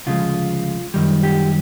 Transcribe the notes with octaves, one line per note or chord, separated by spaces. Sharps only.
D2 C#3 F3 G#3 F4
F#2 D#3 G3
G4